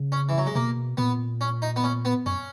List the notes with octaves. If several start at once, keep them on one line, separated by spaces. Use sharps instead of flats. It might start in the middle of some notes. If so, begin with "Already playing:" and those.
Already playing: C#3
C#4
E3
F#3
G#3
B2 A#3
A#2 B3
C#4
D#4
B3
C#4
B3
F#2 C#4